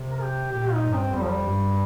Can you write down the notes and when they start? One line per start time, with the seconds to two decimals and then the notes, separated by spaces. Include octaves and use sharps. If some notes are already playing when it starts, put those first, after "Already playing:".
Already playing: C3
0.11 A#4
0.22 G4
0.52 A#2 G4
0.73 D#4
0.84 G2
0.94 C4
1.14 F2 G3
1.22 F3
1.29 G3
1.45 G2